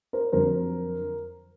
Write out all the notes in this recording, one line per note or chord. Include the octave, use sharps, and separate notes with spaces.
A#4 C5
F2 D3 F#3 A#4 C5